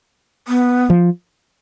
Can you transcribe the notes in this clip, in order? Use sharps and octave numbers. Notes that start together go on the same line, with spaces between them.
B3
F3